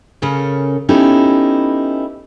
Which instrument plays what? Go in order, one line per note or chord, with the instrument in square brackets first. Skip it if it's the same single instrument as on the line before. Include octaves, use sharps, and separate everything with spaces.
[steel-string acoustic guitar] C#3 C#4 A4 A#4
B3 C#4 D#4 E4 G4 A4